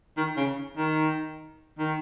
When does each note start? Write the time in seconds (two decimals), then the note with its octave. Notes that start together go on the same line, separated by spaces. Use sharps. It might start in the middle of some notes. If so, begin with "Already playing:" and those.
0.17 D#3
0.37 C#3
0.77 D#3
1.79 D#3